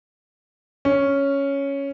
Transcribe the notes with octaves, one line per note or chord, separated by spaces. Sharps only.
C#4